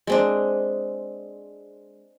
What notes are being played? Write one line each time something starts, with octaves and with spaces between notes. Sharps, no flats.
G#3 C4 D4